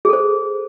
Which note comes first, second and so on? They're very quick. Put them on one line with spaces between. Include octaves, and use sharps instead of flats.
G#4 A4 C5